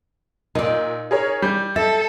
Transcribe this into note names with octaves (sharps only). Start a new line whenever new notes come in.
A#2 D#4 D5
G#4 A#4 C#5
G3 G6
A4 E5 A6